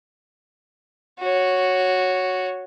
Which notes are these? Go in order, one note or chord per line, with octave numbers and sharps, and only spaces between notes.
F#4 C#5